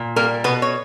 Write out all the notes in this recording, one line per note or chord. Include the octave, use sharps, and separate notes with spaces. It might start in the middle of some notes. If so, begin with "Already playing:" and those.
Already playing: A#2
G3 A#3 A#4
B2 B3 B4
C#5